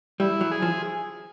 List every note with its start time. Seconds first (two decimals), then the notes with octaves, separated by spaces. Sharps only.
0.20 G3 E4
0.41 F#3
0.51 G#4
0.62 F3